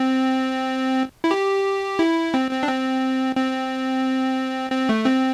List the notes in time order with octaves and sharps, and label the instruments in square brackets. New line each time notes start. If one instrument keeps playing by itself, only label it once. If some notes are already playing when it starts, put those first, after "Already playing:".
Already playing: [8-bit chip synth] C4
E4
G4
E4
C4
C4
D4
C4
C4
C4
A3
C4